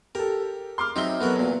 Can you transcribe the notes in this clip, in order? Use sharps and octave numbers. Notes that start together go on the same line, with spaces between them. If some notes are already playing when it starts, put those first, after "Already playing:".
G4 A4 A#4
C6 D6 F6
F#3 C4 D#4 E5 G7
F#3 B3 F#4 A4 A#4
E2 A#2